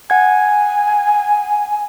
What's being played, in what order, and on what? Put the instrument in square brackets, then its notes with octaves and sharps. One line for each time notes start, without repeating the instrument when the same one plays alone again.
[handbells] F#5 G#6 [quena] G#5